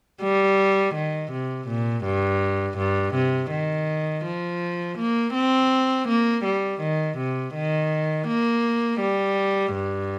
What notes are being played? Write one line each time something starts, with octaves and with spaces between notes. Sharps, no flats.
G3
D#3
C3
A#2
G2
G2
C3
D#3
F3
A#3
C4
A#3
G3
D#3
C3
D#3
A#3
G3
G2